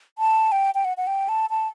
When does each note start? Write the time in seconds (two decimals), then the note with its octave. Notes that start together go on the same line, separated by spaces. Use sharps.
0.18 A5
0.52 G5
0.75 G5
0.85 F#5
0.97 F#5
1.07 G5
1.29 A5
1.50 A5